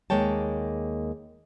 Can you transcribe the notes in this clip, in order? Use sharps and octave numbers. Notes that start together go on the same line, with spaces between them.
D#2 G#3 A#3 C#5 G5 A5